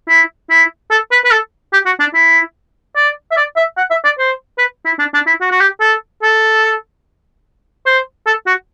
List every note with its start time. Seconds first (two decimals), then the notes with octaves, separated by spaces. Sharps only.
0.09 E4
0.50 E4
0.91 A4
1.12 B4
1.25 B4
1.32 A4
1.73 G4
1.86 F#4
2.00 D4
2.14 E4
2.96 D5
3.31 E5
3.37 D5
3.57 E5
3.78 F#5
3.91 E5
4.05 D5
4.19 C5
4.59 B4
4.86 E4
4.99 D4
5.14 D4
5.27 E4
5.41 F#4
5.51 F#4
5.61 G4
5.81 A4
6.23 A4
7.86 C5
8.26 A4
8.47 F#4